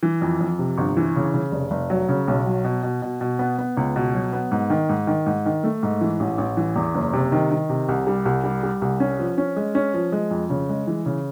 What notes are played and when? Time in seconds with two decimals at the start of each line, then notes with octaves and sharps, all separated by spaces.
0.03 E3
0.22 F2
0.40 F2
0.59 C3
0.78 G1
0.97 E3
1.16 C#3
1.34 C#3
1.52 F1
1.71 F1
1.90 F#3
2.09 C#3
2.28 B1
2.46 F#3
2.65 B2
2.83 B2
3.02 B2
3.21 B2
3.39 B3
3.58 B3
3.77 C#2
3.96 B2
4.14 F#3
4.33 B3
4.52 G#2
4.70 D#3
4.89 G#2
5.07 D#3
5.26 G#2
5.46 D#3
5.64 A3
5.83 G#2
6.01 E3
6.20 A1
6.38 A1
6.57 E3
6.76 E2
6.94 F#1
7.13 C3
7.32 D#3
7.51 D#3
7.69 C3
7.88 C2
8.07 G3
8.25 C2
8.44 G3
8.63 G3
8.82 C2
9.00 C#4
9.19 F3
9.38 C#4
9.56 G#3
9.75 C#4
9.94 F3
10.12 G#3
10.31 F2
10.50 C#3
10.69 G#3
10.87 E3
11.06 C#3